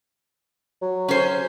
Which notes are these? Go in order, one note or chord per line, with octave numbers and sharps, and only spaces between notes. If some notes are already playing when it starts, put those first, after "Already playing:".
F#3
C#4 C5